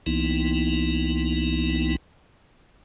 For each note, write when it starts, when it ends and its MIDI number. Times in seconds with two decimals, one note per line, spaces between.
0.06 1.96 36
0.06 1.96 52
0.06 1.96 58
0.06 1.96 59
0.06 1.96 63
0.06 1.96 64